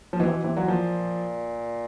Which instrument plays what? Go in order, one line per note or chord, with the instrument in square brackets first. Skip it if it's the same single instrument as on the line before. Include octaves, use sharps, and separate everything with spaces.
[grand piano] F3
[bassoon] B2 [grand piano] E3
[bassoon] C3
B2
[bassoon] C3 [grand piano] E3
[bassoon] A#2 [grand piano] F#3
[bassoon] A#2 [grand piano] F3